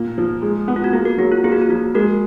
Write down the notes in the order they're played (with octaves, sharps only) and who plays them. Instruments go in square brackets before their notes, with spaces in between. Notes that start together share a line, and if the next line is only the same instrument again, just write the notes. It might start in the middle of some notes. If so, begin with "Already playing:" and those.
Already playing: [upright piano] A#2 A#3
F3
G#3
B3
[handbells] F4
F#4
[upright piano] A#3 [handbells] G#4
[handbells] F#4 A#4
[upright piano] F#3 [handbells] G#4
[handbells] F4
[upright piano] A#3 [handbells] G#4
[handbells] F#4
F4
[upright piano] F3 [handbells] F#4
[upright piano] G#3 [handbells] F#4 A#4